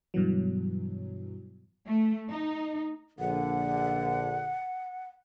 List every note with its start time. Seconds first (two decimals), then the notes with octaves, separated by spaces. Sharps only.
0.14 G2 B2 E3 F#3
1.87 A3
2.29 D#4
3.19 A#1 D3 F#5